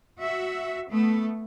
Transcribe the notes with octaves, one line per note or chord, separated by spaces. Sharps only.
F#4 E5
A3 B3